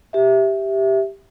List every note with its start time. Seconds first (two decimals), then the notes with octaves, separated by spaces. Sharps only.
0.13 G4 E5